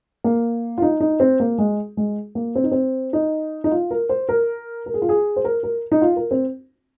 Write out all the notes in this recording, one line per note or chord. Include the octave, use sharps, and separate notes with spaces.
A#3
F4
D#4
D#4
C4
A#3
G#3
G#3
A#3
C4
D#4
C4
D#4
D#4
F4
A#4
C5
A#4
A#4
G#4
F4
G#4
C5
A#4
A#4
D#4
F4
A#4
C4